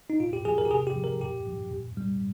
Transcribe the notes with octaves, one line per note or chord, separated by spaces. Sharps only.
D#4
A#2 F4
G4
F3 G#4
A#4
G4
C3 G#4
G4
F3
A#4
A#2 G4
F3
A#2
G3